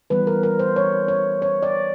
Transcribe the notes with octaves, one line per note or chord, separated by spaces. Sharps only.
E3 G3 B3 B4
A#4
A#4
C5
C#5
C#5
C#5
D5